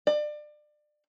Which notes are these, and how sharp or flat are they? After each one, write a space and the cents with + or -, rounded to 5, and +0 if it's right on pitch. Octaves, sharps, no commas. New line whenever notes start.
D5 +30